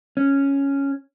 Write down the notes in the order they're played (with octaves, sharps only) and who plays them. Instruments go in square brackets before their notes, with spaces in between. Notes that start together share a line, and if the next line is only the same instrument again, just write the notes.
[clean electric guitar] C#4